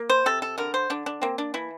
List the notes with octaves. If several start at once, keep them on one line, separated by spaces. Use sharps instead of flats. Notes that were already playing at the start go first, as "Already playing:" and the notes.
Already playing: A#3
C5
C3 A4
A4
D3 A#4
C5
D3 D4
D4
A#3 C4
D4
E3 E4